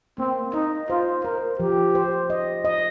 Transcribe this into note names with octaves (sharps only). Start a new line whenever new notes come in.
A#3 C4
D#4 D#5
F4 C5
A#4 C5
F3 G4
C5
D#5
D#5